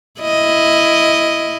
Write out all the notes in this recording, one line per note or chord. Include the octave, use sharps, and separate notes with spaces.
E4 D#5